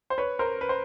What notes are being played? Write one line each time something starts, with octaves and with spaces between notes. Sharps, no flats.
C5
B4 C#5
A#4 C5
B4
C5